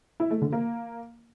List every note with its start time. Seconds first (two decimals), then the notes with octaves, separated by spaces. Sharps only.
0.20 E4
0.31 A3
0.42 D3
0.52 A#3